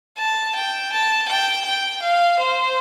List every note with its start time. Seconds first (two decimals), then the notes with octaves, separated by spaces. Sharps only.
0.18 A5
0.55 G5
0.92 A5
1.28 G5
1.65 G5
2.02 F5
2.39 C5